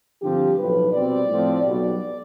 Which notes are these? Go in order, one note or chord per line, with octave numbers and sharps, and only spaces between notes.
G2 D3 F3 C4 G4
B1 A2 F3 B4
C2 B2 G3 C4 D5
A2 F3 C4
B1 B2 G3 D5